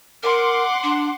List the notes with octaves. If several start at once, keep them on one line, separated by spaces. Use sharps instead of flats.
A#4 F#5 C6 D6
D4